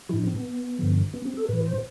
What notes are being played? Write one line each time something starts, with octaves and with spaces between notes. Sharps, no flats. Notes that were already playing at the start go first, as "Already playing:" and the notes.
A2 F3 D4 E4
C4
B3
G2 D3 F3
B3
C4
A4
A2 E3 B4
C5